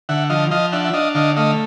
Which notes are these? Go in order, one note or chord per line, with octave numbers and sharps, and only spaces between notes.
D3 E5 F#5
F3 D#5 F5
F3 D#5 F5
D4 E5 F#5
E5
D4 D#5 F5
D3 D#5 F5
A3 D#5 F5